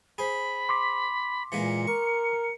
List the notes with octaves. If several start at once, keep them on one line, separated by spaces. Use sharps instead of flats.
G#4 C5 B5
C6 D6 B6
A#2 E3 G#3 A#3 C#7
A#4 C#6